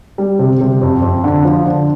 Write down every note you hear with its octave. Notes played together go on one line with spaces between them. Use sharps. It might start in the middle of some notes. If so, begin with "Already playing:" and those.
G3
C3
C3
F2
F2
D3
F3
D3